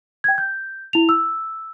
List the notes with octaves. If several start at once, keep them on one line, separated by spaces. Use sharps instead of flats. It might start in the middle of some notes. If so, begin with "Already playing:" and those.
G5 G#6
G6
E4 F7
E6